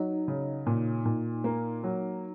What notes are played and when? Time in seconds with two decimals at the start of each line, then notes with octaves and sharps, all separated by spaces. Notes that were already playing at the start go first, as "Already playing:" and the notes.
Already playing: F#3 D#4
0.28 C#3
0.66 A#2
1.05 A#2
1.44 A#3
1.83 F#3